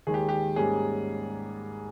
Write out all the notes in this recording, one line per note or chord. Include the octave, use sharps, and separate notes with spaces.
D#2 D#3 G#3 G#4
G4
G4
G#2 G3 A#3 C#4 G#4